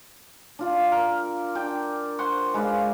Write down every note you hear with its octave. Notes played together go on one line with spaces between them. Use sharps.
D4 F4 D5
A#4
D4 D5 G5
C5 F#5 C6 C#6
G#3 B4 D5 F5